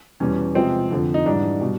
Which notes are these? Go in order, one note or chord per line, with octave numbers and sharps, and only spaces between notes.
E2 B2 G3 C#4
C3 F3 G#3 C4
F2 D3 F3
D#4
G#2 E3 G3 D4
B2 G3